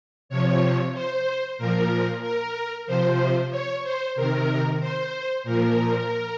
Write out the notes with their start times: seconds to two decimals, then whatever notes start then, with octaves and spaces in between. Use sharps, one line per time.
0.29 C3 F3 C#5
0.94 C5
1.58 A#2 F3 A#4
2.22 A#4
2.87 C3 F3 C5
3.51 C#5
3.83 C5
4.16 C3 D#3 A#4
4.80 C5
5.44 A#2 F3 A#4